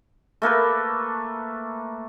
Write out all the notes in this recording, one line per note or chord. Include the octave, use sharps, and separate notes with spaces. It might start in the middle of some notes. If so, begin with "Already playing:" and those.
A3 A#3 A4 B4